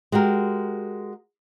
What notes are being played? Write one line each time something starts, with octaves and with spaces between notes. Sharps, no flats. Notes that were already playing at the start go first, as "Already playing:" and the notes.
G#3 F#4 G4 A#4